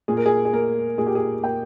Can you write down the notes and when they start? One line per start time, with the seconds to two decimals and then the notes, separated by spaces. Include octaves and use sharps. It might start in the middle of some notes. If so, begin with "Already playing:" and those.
0.08 A#2 G#4
0.17 A#4
0.26 G#4
0.45 G#4
0.53 A#3 A#4
0.98 A#2 G#4
1.06 G4
1.15 G#4
1.43 A#3 G5